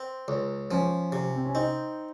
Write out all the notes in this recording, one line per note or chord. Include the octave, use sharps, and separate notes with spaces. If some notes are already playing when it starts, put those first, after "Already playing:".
Already playing: C4
C#2
F3 C#4
C3
C4
C#4
C4 D#4